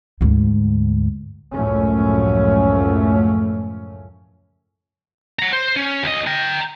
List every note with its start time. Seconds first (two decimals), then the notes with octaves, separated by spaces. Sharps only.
0.21 D2 G#2
1.54 C#2 F#2 A2 F3 A3 C#4
5.39 F#5 A#5
5.53 C5
5.76 C#4
6.03 D2 D#5
6.27 G5 A#5